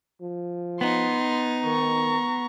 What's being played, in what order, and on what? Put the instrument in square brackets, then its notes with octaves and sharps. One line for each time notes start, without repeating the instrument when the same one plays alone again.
[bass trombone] F3
[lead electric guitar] B3 [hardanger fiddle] D#4 [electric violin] C6
[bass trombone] D#3 [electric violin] A#5 C#6